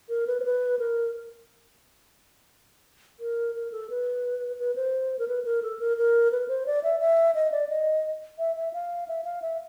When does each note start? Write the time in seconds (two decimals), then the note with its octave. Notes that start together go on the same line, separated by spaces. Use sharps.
0.09 A#4
0.27 B4
0.40 C5
0.45 B4
0.79 A#4
3.20 A#4
3.55 A#4
3.72 A4
3.90 B4
4.59 B4
4.76 C5
5.19 A#4
5.28 B4
5.45 A#4
5.63 A4
5.79 A#4
5.97 A#4
6.32 B4
6.48 C5
6.66 D5
6.83 E5
7.00 E5
7.35 D#5
7.52 D5
7.69 D#5
8.39 E5
8.56 E5
8.73 F5
9.08 E5
9.24 F5
9.42 E5